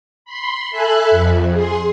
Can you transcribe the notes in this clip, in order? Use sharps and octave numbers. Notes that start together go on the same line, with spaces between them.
B5 C6
A4 E5 G#5 B5 F#6
F2
G#4 C6